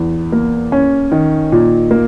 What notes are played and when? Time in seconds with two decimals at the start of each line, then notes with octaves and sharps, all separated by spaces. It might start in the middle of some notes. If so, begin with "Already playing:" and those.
Already playing: E2
0.32 A#3
0.72 C#4
1.12 D#3
1.52 A#2
1.91 A#3